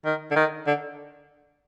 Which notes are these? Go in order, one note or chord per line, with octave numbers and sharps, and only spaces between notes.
D#3
D3
D#3
D3